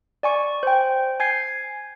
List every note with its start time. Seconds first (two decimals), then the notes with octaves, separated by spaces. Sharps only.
0.23 D5 G#5 C#6
0.63 C5 G5
1.20 G#5 G6 G#6 C7